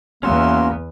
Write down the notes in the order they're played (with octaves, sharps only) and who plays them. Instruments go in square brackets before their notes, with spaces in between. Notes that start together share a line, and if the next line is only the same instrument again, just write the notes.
[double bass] E2 B3 [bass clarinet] A#3 [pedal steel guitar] C#4 F#4 E5 [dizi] C6